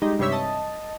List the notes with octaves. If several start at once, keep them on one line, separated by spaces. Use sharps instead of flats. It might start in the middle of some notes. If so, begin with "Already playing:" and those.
G3 G#3 D#4
G2 C3 G3 C#5 E5 B6
D#5 A5